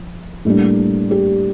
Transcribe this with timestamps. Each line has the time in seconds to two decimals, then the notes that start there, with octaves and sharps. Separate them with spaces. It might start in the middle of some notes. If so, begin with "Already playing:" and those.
Already playing: F3
0.45 A2 G3 A#3 D4
1.11 G4